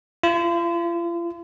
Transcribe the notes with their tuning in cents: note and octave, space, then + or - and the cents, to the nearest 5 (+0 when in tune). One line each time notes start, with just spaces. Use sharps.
F4 -40